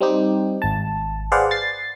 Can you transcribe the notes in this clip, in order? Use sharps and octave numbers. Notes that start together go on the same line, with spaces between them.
G3 C4 D#4 G4
G#1 A5
G#4 B4 C5 D5 F5 F#5
A6 C7